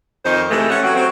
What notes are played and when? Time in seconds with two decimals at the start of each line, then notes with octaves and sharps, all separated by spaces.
0.25 F2 D#3 D#4 C5
0.49 C3 E3 G#3 A3
0.70 C#4 F#5
0.83 F#3 A3 C4 C#4 F#4
0.95 F#3 C4